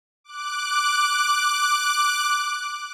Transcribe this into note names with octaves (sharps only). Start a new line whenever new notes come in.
D6 F#6